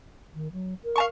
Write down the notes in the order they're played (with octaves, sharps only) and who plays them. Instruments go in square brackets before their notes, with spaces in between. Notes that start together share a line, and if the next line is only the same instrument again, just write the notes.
[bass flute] D#3
F#3
A#4
[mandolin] F5 A5 C#6